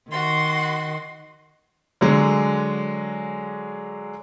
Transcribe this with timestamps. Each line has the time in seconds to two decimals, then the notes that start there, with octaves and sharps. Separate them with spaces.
0.11 D#3 F#4 C6
2.01 D3 F#3 G#3